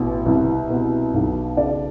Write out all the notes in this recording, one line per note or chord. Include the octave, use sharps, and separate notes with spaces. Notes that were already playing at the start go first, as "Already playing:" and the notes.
Already playing: A1 B2
C2
B2
B1
C#3 D5